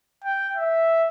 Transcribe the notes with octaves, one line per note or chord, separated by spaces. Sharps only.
G5
E5